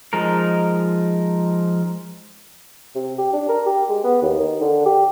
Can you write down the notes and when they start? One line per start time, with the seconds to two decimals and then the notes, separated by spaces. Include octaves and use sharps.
0.13 F3 G#3 D#4 A#4
2.95 C3
3.18 G4
3.33 D4
3.49 A#4
3.66 G4
3.89 G#3
4.04 B3
4.22 D#2
4.39 D#3
4.61 D3
4.86 G4